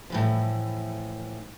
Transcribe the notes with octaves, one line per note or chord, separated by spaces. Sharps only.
A2 E3 F3